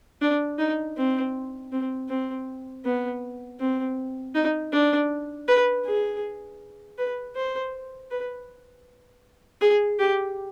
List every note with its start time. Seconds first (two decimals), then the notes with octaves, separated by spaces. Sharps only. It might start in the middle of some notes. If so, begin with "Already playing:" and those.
0.21 D4
0.59 D#4
0.97 C4
1.72 C4
2.09 C4
2.85 B3
3.60 C4
4.35 D#4
4.72 D4
5.48 B4
5.86 G#4
6.98 B4
7.36 C5
8.11 B4
9.61 G#4
9.99 G4